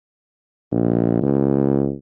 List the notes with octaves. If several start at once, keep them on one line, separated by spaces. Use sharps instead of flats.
A#1
C#2